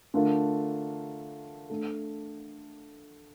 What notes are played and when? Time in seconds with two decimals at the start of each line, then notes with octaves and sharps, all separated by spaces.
0.14 D3 A3 D4 F4 A#4
1.70 A3 D4 A4